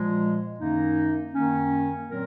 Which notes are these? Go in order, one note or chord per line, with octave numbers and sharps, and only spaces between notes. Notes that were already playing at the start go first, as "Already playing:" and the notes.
Already playing: A#2 F3 G#3
F#2 D#3 A#3 D#4
F#2 D#3 A#3 C#4
A#2 F#3 C4 F4 A#4